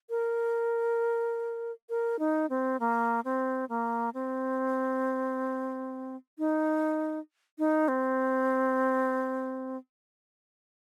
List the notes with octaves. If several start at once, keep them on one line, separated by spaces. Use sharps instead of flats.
A#4
A#4
D#4
C4
A#3
C4
A#3
C4
D#4
D#4
C4